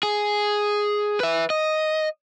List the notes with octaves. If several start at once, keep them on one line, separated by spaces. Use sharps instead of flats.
G#4
B4 E5
D#5